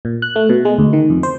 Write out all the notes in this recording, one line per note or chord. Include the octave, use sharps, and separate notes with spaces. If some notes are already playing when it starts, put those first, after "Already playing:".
A#2
F#6
A3
B2
G#3
D2
D#3
F2
C5